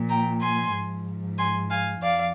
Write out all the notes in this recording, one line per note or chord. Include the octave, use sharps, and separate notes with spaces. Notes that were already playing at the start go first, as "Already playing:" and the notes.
Already playing: A#2 F3
G5 A#5
G#5 C6
G#2 F3
G#5 C6
F5 G#5
F2 D5 F5